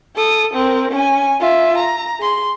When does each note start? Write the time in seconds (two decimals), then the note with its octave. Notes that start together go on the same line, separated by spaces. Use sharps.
0.16 A4 D#6
0.54 C4 A#4
0.91 C#4 G#5
1.40 F4 E5
1.78 A#5
2.19 G#4 C6